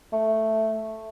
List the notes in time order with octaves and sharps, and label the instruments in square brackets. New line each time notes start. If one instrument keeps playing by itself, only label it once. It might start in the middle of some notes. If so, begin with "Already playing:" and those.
[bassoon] A3